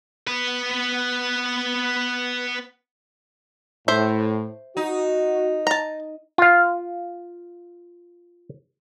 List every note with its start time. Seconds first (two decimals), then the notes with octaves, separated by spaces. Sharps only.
0.27 B3 B4
3.88 A2 C5 E5
4.77 D#4 F#4
5.67 A5 A#5
6.38 F4 F5